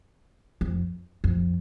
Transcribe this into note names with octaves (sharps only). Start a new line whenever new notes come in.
F2
F2